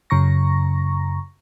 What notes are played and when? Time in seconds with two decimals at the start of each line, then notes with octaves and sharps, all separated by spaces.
0.10 F#2 C#3 A#5 C#6 A#6